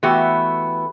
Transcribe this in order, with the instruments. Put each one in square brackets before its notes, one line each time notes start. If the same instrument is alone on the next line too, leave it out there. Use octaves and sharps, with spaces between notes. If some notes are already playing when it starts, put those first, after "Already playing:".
[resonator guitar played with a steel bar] E3 A3 B3 F#4 G4